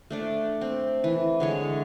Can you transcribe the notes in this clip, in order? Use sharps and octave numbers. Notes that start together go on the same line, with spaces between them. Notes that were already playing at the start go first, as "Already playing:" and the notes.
A3 D4 D5
C4
E3
D3 G#3 C#5